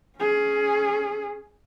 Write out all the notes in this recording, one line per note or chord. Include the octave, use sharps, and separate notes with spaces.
C#4 G#4